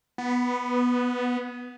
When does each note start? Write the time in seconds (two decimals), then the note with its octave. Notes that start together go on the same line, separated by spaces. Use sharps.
0.18 B3